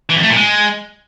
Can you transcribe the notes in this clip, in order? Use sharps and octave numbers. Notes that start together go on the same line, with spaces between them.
E3
F2
A3
A#2
G#3